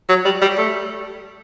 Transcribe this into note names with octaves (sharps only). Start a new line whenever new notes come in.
F#3
G3
G3
A3